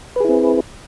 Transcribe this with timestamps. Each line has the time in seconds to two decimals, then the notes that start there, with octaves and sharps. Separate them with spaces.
0.16 B4
0.20 G#4
0.25 E4
0.29 C4